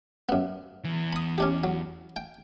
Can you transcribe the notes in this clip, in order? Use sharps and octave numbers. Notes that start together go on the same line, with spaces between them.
F#2 B3
E2 E3
B5 D#6
C#4 D4 G4
F#3
G5